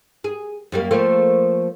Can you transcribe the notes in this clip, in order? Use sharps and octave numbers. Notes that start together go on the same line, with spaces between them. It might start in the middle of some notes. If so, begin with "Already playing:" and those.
G#4
F#2 G3 A#3
F3 A3 A#3